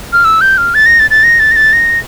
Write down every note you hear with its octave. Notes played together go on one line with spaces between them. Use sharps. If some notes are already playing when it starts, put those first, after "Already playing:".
F6
E6
G6
F6
A6
A#6
A6
A6
A#6
A6
A#6
A6
A#6